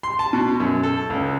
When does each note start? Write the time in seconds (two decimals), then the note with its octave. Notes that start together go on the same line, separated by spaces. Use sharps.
0.03 C6
0.19 A5
0.33 B2
0.60 F#2
0.83 A4
1.10 C#2